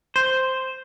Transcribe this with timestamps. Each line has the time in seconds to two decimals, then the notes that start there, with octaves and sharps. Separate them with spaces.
0.16 C5